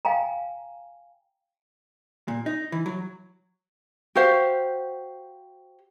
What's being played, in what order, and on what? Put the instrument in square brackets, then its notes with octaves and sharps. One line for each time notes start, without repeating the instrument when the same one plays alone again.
[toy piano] F5 G5 G#5 A#5
[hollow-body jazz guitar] A#2
D#4
E3
F#3
[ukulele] F#4 G4 C5 F5